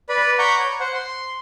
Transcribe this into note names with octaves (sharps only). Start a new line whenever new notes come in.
B4 D5 B5
F#5 A#5 B5 C#6 D6 G6
C#5
C5 F#5
C6